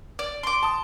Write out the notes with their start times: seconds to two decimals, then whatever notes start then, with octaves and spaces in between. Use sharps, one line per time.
0.19 D5
0.43 C6 D6
0.63 A5 D#6